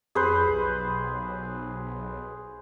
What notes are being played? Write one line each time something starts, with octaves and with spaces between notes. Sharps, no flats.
F2 G#4 B4 C5
B1